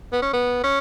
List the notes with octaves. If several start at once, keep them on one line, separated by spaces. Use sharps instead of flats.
B3
C#4
B3
C#4